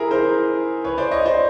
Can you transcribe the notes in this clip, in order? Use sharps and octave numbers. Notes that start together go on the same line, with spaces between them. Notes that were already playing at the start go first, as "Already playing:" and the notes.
Already playing: E4 G#4 A#4
A#4 C5
B4 C#5
C5 D5
C#5 D#5
C5 D5